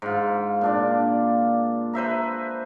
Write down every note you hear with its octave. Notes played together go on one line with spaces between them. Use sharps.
G#2 F4
A#2 D4 D5
B4 C5 E5 A#5